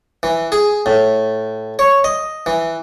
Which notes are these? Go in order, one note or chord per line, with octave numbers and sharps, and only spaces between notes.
E3
G#4
A2
C#5
D#5
E3